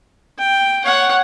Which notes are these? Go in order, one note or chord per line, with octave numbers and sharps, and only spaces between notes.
G5
C#5 F#5